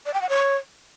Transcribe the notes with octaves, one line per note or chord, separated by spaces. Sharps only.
D5
G5
F#5
C#5